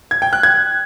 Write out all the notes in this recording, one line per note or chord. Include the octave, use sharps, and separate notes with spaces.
G#6
G5
F#6
G#6